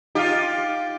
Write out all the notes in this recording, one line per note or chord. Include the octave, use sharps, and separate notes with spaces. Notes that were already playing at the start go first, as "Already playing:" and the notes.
D#4 F4 G4 F5